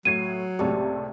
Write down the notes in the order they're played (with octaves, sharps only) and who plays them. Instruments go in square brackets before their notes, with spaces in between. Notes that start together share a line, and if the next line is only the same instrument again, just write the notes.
[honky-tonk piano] A2 G#6 C7 [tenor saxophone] F#3 [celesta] D#7
[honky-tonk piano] C#2 A2 C3 [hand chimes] G4 D5 A5